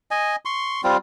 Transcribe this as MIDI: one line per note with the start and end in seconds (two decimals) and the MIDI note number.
0.11 0.36 75
0.11 0.36 80
0.45 0.81 84
0.45 0.81 85
0.84 0.97 55
0.84 0.97 60
0.84 0.97 65